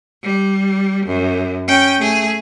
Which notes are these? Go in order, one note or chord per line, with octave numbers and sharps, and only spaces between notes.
G3
F#2
C#4 G5
A3 G#4